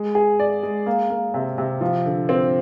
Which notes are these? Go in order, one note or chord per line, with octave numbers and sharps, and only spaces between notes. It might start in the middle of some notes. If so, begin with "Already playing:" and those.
Already playing: G#3
G#4
D5
G#3
A#3
A#3
C3
C3
F3
D3
C4